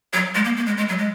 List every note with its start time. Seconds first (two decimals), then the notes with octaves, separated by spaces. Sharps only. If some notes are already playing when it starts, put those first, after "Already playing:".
0.13 F#3
0.35 G#3
0.45 A#3
0.56 A#3
0.66 G#3
0.78 G#3
0.88 F#3
0.98 G#3